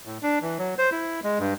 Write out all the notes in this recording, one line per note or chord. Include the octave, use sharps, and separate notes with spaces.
A2
D4
E3
F#3
C5
E4
G#3
G2